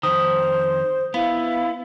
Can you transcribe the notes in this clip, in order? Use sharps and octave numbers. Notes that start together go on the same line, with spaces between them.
F2 D#3 C5 D#6
B3 E4 F5